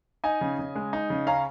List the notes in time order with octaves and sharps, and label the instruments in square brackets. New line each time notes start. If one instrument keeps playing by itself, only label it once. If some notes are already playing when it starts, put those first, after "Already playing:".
[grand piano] D#4 D#5 G#5
C#3
C#3
G#3
D#4
C#3
C#4 F5 A#5